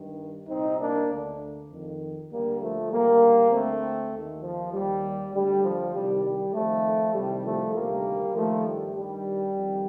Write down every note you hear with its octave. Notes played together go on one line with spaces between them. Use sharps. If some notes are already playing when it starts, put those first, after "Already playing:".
Already playing: G2 D#3
C2 A#2 C4 D#4
A#3 D4
D2 D3
F2 D#3
D2 D3 G3 A#3
F3 A3
D#2 D3 G3 A#3
D2 D3 A3 C4
D#2 D#3
F3
D#2 D#3 G3
D2 D3 G3
F3
C2 C3 D#3 G3
G3
F2 D#3 F3 A3
C2 C3 D#3 G3
F3 A3
D2 C3 D#3 G3 A#3
G2 D#3 F3 A3
G3
G2 D#3 G3
F2 D#3